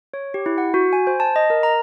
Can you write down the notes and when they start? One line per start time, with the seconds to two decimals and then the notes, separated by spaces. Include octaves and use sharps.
0.14 C#5
0.34 G4
0.46 E4
0.58 F#5
0.74 F#4
0.93 G#5
1.07 C5
1.20 A5
1.36 D#5
1.50 A#4
1.63 A#5